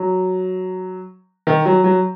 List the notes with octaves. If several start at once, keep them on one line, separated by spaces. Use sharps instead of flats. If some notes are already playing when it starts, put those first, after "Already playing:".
Already playing: F#3
D#3
F#3
F#3